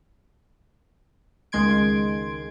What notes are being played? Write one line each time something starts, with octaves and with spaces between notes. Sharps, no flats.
C#2 D#3 G#3 C6 G#6 D7